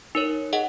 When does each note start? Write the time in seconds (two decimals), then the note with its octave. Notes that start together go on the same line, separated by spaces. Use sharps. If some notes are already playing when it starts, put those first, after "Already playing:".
0.15 D#4 A#4 C#5
0.53 G#4 D#5 F#5